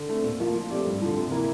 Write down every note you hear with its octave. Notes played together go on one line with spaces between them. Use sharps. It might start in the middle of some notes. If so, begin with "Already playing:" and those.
Already playing: D3
A3 C4
A#2
F3 A#3 F4
F3
A3 C4 G4 D5
G2
D3 F3
C3
E3 A#3 E4 A#4